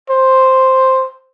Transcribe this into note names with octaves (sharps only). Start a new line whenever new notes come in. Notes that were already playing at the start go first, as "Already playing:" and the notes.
C5